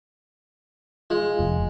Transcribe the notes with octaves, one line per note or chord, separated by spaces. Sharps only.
G#3 F4
F1